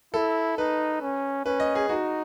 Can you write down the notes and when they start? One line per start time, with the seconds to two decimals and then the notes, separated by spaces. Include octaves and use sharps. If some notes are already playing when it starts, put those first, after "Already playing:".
0.14 E4 A4
0.57 D#4 B4
1.01 C#4
1.45 C#4 B4
1.60 D#5
1.75 G#4
1.89 D#4 F#4